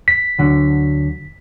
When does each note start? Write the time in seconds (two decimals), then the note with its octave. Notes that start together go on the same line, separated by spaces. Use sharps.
0.08 B6
0.39 D2 D3 F#3